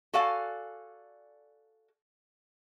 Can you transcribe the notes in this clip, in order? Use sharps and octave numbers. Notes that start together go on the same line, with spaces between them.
F#4 A4 D5 F5 G#5